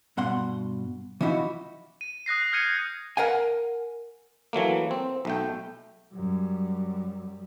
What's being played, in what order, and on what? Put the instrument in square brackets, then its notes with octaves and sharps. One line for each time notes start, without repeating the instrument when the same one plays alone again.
[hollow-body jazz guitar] G2 B2 F#5 C6
E3 F3 D#4 E4 F#4
[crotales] D#7
D#6 F#6 A#6 C7
F6 G6 G#6 C#7 D#7
[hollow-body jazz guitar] A#4 F5 F#5 G#5
[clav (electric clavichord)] E3 F#3 A3 A#3
C4
B1 A3 G5
[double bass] F#2 G3